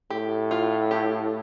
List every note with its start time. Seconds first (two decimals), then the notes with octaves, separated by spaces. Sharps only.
0.10 A2 G4
0.51 F4
0.91 G4